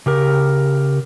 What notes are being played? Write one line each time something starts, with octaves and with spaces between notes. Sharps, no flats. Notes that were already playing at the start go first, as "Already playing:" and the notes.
C#3 G4 A#4